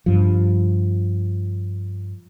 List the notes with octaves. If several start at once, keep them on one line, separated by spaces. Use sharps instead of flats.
G2 F3